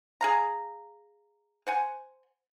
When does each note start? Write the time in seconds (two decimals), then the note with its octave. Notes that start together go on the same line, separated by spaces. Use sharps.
0.21 G#4 F5 A#5
1.67 C5 F#5 G#5